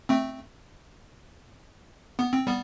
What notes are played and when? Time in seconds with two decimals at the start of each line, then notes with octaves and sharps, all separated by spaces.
0.09 A3 C4
2.19 B3
2.33 C4
2.47 G3 B3